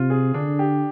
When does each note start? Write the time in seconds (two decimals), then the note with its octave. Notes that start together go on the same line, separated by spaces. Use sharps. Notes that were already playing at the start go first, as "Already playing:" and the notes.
Already playing: C3 F4
0.10 G#4
0.34 D3 D4
0.59 G4